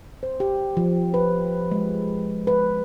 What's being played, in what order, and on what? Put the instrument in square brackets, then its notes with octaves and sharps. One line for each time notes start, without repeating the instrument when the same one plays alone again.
[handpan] C5
G4
F3
B4
G#3
B4